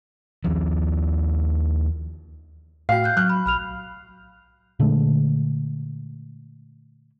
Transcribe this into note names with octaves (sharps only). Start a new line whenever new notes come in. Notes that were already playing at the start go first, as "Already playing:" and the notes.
D#2 F3
A2 F#4 F5 G5 C7
F#6 G6
F#3 F6 F#6
B5
B1 B5 F6 F7
A#2 D3 G#3 A3